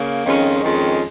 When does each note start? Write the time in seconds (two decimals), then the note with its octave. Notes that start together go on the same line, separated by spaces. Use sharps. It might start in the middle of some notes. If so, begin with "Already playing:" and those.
Already playing: C#3 A#3
0.25 F2 D#3 G#3 C#4 F4
0.63 F2 D#3 G#3 C#4 F4